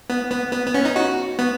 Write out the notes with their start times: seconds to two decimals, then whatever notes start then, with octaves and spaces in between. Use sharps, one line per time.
0.10 B3
0.31 B3
0.52 B3
0.67 B3
0.74 C#4
0.85 D#4
0.96 F#4
1.39 B3